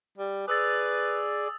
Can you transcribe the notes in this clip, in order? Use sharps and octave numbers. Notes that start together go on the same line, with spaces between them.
G3
G#4 B4 D5 D#6 E6 A6